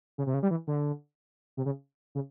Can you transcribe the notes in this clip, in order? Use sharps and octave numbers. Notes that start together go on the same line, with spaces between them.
C#3
C3
C#3
G3
E3
D3
C3
C#3
C#3